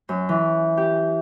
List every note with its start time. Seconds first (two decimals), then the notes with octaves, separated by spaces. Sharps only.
0.09 F#2
0.29 E3
0.77 G4